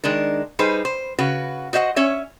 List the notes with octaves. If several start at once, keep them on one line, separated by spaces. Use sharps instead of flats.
D#3 G#3 D4 A#4
G3 D#4 G#4 B4 C5
C5
C#3 F#4 B4
F#4 C5 D#5 E5 F#5
C#4 C#5 E5